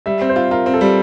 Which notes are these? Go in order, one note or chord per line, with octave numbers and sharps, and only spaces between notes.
G3 E5
C4
C5
F4
F4 A#4
C4
A4
G3